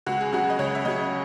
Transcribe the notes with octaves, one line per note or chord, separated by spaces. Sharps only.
C#2 F#4
G#4
C#3 F#3 F#4
D#5
C#2 C#5
E5
C#3 F#3 D#5